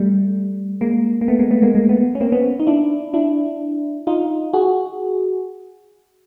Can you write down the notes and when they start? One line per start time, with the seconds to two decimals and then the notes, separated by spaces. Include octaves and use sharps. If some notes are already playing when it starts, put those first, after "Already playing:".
Already playing: G3 A3
0.81 G#3 A#3
1.21 A#3
1.28 A3 B3
1.39 G#3 A#3
1.51 A3 B3
1.62 G#3 A#3
1.75 G#3 A#3
1.89 A3 B3
2.15 C#4
2.21 A#3 C4
2.32 B3 C#4
2.60 D#4
2.67 D4 E4
3.14 D4 E4
4.07 D#4 F4
4.53 F#4 G#4